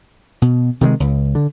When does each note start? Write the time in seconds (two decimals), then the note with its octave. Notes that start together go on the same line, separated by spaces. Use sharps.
0.42 B2
0.81 C3 D#3 F3 G#3
1.00 C#2
1.35 D3